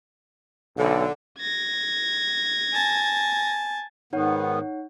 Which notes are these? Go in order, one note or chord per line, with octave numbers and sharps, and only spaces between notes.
B1 D3
G#6 A#6
G#5 A5
G#2 D#3 B3 D#4 C#5 F#5